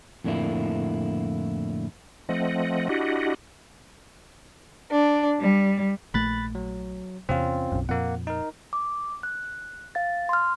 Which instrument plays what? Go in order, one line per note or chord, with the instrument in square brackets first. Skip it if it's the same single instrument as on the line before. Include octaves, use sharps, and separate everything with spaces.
[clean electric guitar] F2 A2 D3 A#3 E4
[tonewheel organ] F3 A3 C4 D#5 F#5
D4 E4 F#4 G4 D#5 F#5
[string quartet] D4
G3
[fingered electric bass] A#1 A3 [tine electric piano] B5 F#6 A6
[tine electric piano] F#3
[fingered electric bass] E2 C3 [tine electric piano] C4 C#4 F4
[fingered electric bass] B1 F#2
[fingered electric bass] F2 A#2 [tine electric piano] A#3 F#5
[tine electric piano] D#4 A#4
[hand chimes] D6
F#6
F5 A6
C6 F6